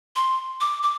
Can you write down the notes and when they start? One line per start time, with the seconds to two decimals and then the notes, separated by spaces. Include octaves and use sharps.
0.16 C6
0.61 D6
0.83 D6